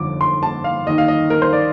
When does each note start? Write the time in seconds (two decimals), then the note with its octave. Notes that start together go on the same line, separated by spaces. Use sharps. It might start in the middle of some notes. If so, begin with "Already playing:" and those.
Already playing: G1 F2 D3 F3 D6
0.21 C6
0.43 A5
0.64 F5
0.87 D#2 D#3 D#5
0.98 F5
1.08 D#5
1.30 A#4
1.42 C5
1.53 D5